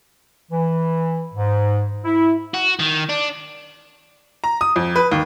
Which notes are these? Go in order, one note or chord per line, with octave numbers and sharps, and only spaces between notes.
E3
G#2
E4
F#4
D#3
D4
A#5
D#6
F2
B4
D#2